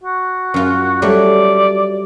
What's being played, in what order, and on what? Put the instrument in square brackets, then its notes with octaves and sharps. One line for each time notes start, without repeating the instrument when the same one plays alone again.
[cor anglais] F#4
[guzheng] F#2 F4
[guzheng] F#3 G3 A3 [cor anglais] D5